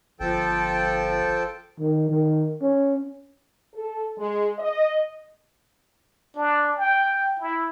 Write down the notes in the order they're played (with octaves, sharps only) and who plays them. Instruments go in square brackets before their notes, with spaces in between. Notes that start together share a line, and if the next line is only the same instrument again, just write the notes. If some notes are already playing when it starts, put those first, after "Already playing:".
[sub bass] G1 [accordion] F3 A4 G5
[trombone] D#3
D#3
C#4
[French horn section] A4
G#3
D#5
[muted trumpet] D4
G5
E4